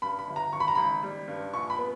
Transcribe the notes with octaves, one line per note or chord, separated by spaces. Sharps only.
G2 B5
B5
G1
A#5
G#1 C#6
B5
A#5
G#1 B5
G3
G2
A#1 C#6
B5
B3